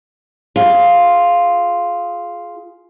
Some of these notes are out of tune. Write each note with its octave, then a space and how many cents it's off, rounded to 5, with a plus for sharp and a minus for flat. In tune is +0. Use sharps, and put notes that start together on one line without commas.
F4 +0 G#4 +20